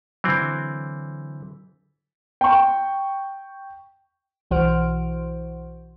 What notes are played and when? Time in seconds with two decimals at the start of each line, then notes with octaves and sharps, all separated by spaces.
0.24 D3 E3 F#3 C4
2.41 G5 C#6
4.51 B1 E3 F#4 C5 F6 D7